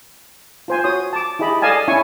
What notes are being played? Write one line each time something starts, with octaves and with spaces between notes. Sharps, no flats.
F4 C5 G#5
F#4 C#5 C6 D#6
A5 D6
E4 G4 G#4 D#5 B5
A4 D5 D#5 F5 G#5 A5
C#4 E4 G#5 C#6